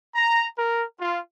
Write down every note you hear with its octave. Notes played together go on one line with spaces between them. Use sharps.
A#5
A#4
F4